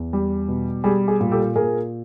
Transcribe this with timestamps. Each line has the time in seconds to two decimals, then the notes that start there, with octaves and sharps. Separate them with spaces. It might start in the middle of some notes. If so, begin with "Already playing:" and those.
Already playing: E2
0.13 G3
0.49 B2
0.84 G3 G#4
1.08 G#4
1.20 A#2
1.32 G4 A4
1.56 A#2 G#4 A#4